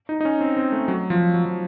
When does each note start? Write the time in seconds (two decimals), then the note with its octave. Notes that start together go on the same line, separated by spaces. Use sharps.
0.09 D#4
0.21 D#4
0.25 C#4
0.41 C4
0.57 C4
0.72 A3
0.88 F#3
1.10 F3
1.34 F#3
1.45 F3